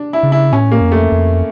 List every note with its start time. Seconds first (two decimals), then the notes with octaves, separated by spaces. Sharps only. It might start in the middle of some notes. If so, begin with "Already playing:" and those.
Already playing: D4
0.13 E4
0.23 C#3
0.32 E4
0.53 A2 C#4
0.72 A#3
0.81 F2
0.92 A3
1.12 F2